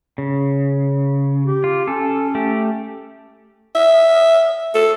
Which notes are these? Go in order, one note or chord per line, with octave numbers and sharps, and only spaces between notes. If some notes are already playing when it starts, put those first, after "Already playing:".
C#3
G4
F4
C#4 A4
A3 G4
E5
A4